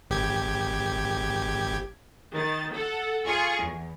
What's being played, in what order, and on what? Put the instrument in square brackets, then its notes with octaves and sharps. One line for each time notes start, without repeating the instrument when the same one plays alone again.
[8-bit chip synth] G#1 G4 G#6
[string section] D#3 A6
A4 F#5
F4 G#4 G#5 C#6
E2